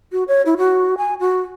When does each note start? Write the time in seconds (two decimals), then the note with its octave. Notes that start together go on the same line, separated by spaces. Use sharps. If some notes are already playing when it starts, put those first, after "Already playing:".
0.12 F#4
0.28 C#5
0.46 E4
0.58 F#4
0.98 G#5
1.20 F#4